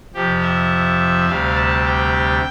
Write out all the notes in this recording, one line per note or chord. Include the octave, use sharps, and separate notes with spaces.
F2 C3 F3 G4
E5
D2 C3 G3 F5
A5
G5